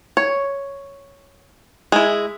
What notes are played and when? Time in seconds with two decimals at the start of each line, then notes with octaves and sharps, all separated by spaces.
0.17 C#5
1.92 G#3 E4